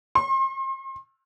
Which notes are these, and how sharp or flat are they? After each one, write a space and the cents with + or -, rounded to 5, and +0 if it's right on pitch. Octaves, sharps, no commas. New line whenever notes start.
C6 +40